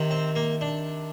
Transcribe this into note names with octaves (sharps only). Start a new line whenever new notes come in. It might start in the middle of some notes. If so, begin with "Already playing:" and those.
Already playing: C3 D#3
C4
A#3
D4